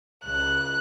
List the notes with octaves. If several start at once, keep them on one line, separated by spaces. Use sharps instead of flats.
C#2 F#6